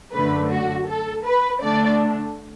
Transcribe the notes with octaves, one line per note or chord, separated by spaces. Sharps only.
F#2 D3 A3 B4
F#4
A4
B4
D3 A3 D4 D5